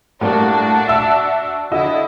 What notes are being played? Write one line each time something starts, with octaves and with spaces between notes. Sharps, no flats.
A2 G3 A#3 D4 F#4
E5 E6
D3 E4 F#4 D#5 E6